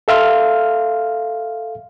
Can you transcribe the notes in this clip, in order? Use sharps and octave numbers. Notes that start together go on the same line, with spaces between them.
A4 E5 F5 C6 F6